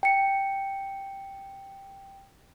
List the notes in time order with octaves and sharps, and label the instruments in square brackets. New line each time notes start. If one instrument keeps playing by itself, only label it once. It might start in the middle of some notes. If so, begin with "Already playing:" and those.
[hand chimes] G5 C#7